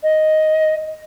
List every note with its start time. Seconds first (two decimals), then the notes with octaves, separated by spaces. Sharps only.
0.03 D#5